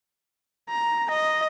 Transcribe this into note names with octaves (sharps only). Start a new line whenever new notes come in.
A#5
D#5